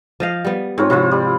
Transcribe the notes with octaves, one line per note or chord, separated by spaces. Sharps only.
F3 D#5 F5
G3 B3
G#2 C4 F4 C#5
C3 F3 E4 F4 C5
G3